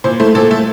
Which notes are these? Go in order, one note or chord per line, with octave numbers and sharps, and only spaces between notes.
A#2 C5
A3 C5
A#2 A4
A3 A4